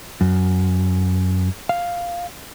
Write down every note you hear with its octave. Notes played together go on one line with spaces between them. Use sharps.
F#2
F5